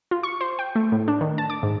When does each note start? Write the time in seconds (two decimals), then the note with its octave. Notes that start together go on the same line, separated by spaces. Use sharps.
0.11 F4
0.23 C#6
0.41 C5
0.59 G5
0.75 A3
0.92 A2
1.08 D4
1.21 D#3
1.38 A5
1.50 D6
1.63 G#2